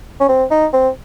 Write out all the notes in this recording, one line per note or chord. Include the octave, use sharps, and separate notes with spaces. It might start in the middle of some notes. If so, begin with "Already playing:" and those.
C#4
C4
D#4
C4